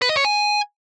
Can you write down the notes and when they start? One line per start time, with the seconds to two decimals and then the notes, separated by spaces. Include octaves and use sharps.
0.02 B4
0.09 D#5
0.17 C#5
0.25 G#5